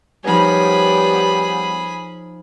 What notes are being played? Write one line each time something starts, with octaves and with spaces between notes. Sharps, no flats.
F3 G3 B3 D#4 G#4 C#5 B5